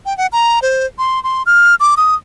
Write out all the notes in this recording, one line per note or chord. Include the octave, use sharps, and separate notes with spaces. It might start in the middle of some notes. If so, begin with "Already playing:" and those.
G5
F#5
A#5
C5
C6
C6
F6
D6
D#6